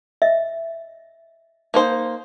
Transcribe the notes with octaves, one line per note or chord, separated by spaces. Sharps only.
D#5 E5
A#3 D#4 C5